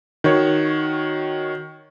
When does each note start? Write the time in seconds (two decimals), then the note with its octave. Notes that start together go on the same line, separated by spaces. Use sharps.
0.24 D#3 F#4 C#5